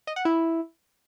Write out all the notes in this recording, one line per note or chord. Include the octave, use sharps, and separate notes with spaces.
D#5
F#5
E4